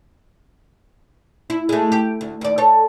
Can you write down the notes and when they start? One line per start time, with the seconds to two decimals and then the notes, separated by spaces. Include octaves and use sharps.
1.50 E4
1.69 G#3 A3
1.92 G4
2.21 D2
2.41 D#2 D5
2.58 A4 C#5